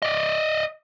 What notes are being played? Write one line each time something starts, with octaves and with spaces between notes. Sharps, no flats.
D5 D#5